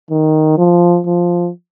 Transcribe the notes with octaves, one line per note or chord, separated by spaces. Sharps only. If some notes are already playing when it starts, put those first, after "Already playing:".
D#3
F3
F3